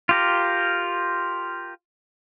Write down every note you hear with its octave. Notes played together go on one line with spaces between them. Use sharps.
F4 G4 A#4